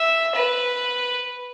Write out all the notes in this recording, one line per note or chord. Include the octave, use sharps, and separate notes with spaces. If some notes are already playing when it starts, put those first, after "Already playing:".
Already playing: E5
B4